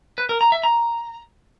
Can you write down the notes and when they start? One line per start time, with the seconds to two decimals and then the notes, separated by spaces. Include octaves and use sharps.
0.18 B4
0.29 A#4
0.41 A#5
0.52 E5
0.63 A#5